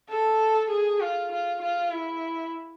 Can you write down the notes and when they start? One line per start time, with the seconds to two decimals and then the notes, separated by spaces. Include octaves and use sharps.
0.09 A4
0.70 G#4
1.00 F4
1.32 F4
1.62 F4
1.92 E4